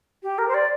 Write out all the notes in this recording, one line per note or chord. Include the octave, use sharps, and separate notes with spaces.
G4
A#4
C5
D5